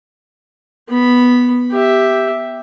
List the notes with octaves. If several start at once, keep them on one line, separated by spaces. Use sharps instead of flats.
B3 B5
G4 E5